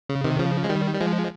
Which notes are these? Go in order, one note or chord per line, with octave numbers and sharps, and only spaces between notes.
C#3
C3 D#3
C#3 F3
G#3
D#3 G3
G3
F3 G#3